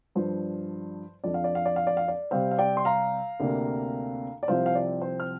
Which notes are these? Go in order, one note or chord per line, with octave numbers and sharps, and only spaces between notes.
G2 F3 D4 C5
F2 F3 D4 D5
F5
D5
F5
D5
F5
D5
F5
D5
C3 G3 C4 C5 F5
F5
D5 G5
C6
F5 A#5
D2 C3 A#3 D4
D5
C2 C3 F3 C4 C5 F5
F5
D5
C5
F6